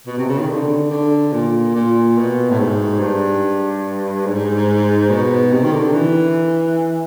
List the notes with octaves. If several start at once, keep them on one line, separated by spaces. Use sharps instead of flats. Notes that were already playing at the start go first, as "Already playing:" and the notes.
B2
C3
C#3
D#3
D3
D3
A#2
A#2
B2
A2
G#2
G2
G#2
B2
C3
D#3
D3
E3